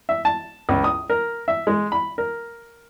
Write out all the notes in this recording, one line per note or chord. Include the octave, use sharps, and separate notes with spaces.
E5
A5
C#2
D#6
A#4
E5
G#3
B5
A#4